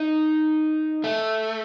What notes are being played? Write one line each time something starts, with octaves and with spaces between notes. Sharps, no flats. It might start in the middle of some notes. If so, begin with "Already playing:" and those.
Already playing: D#4
A3